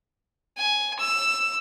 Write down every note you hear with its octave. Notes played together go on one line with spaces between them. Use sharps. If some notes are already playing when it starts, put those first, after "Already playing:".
G#5
E6